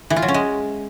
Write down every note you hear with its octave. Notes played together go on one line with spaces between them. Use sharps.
E3
F4
F#3
C#4
G#3